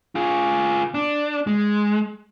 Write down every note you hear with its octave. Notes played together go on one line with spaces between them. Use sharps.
F4 G#4
D4
G#3